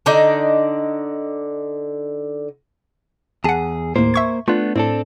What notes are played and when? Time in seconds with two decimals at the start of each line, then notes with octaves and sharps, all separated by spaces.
0.06 D3 D#4 D5 D#5
3.44 E2 G#4 F#5 A5
3.96 D#2 A2 A#3 C5
4.14 E5 C#6 G#6
4.48 A3 B3 D4 F4
4.76 A2 C4 D4 A4